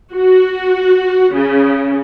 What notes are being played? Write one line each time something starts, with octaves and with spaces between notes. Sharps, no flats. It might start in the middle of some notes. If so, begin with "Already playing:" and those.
F#4
C#3